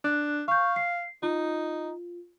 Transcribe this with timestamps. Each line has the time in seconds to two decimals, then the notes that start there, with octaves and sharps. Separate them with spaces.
0.04 D4 F#6
0.48 F5 C#6 G6
0.76 C7
1.23 D#4 F4